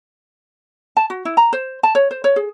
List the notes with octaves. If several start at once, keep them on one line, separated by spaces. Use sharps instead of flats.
A5
F#4
E4
A#5
C5
A5
C#5
C5
C#5
G#4